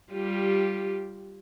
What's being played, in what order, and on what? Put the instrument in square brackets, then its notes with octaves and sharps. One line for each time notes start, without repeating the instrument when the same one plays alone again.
[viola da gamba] G3 F4 G4